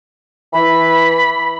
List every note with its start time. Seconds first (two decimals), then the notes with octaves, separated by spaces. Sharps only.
0.53 E3 B5